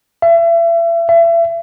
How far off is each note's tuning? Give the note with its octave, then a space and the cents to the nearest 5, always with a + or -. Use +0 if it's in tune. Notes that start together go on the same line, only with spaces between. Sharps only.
E5 +35
E5 +35